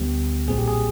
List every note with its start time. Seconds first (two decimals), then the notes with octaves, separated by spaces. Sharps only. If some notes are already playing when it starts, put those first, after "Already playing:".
Already playing: D2 D3 G3 B3 G4
0.48 B1 A#2 G3 C4 G#4
0.58 G4
0.68 G#4